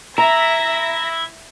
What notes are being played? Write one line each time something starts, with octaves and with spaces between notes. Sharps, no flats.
E4 E5 A#5 A#6